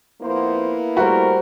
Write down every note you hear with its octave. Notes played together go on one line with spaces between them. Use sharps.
F2 A#3 B3 E4 C5
A2 G3 A3 F#4 A#4 C5 C#6